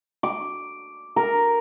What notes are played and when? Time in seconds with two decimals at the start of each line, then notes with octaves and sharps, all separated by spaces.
0.23 D6
1.16 A#4